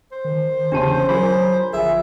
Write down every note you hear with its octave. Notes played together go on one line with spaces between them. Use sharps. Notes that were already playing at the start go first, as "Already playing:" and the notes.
C5
D#3
G1 E2 C#3 D4 G4 A5 C6
F#3 F4 G#4 A#4 C5 G#5 B5
G1 F3 F4 G#4 E5